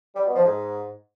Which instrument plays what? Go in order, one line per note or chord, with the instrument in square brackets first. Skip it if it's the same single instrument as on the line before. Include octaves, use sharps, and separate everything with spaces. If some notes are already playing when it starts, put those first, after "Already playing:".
[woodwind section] G3
B2
F3
G#2